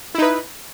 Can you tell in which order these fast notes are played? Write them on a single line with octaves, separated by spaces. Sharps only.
E4 D#4 B4